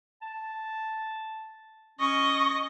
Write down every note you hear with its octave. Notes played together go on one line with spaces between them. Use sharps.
A5
C#4 D#5 C#6